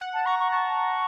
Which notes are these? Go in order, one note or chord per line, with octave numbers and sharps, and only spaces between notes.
F#5
A5
A#5 C#6
C#6
A5 C#6